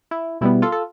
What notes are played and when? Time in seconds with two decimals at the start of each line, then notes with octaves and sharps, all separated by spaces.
0.11 E4
0.41 B2 G3 B3 E4
0.62 F4 A4
0.72 A4